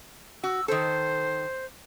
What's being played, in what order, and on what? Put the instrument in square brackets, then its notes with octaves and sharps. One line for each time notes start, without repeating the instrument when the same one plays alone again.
[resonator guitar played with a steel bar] F#4 [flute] E6
[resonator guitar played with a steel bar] D#3 A4 [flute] C5